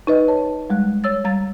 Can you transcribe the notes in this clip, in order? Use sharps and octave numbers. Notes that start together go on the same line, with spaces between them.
D#4 B4 D#5
C#5 A5
G3 G#3 F#6
C#5 E6 A6
G3 A#5 A6